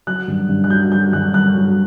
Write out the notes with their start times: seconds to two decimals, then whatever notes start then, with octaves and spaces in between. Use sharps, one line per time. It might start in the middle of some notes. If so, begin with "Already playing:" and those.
0.07 F#3 F#6
0.28 G2
0.49 G2
0.64 F#6
0.70 F#3 G6
0.91 F#3 G6
1.13 G2 F#6
1.34 G2 F#6
1.55 F#3